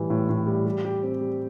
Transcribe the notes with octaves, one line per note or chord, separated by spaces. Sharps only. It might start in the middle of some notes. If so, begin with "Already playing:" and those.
Already playing: A2 E3 G3
A2
A2
G3
G3
G4
C4
G3